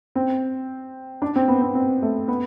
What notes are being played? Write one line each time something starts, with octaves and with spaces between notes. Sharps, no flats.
C4
D4
C4
B3
C4
C4
A3
B3